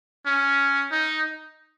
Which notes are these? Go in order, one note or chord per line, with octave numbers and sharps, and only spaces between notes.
C#4
D#4